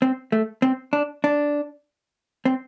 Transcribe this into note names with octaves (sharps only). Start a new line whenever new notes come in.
C4
A3
C4
D4
D4
C4